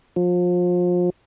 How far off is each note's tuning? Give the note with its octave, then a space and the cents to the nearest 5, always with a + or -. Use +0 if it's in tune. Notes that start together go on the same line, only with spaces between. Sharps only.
F3 +30